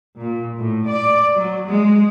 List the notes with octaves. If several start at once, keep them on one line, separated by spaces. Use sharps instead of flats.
A#2
A2
D5
F#3
G#3